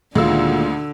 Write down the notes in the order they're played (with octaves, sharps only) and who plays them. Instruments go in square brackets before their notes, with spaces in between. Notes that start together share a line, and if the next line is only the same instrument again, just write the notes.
[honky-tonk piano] D2 E6 [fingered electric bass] A#2 D#3 A#3 [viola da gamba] D3 [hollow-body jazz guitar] G#3 F4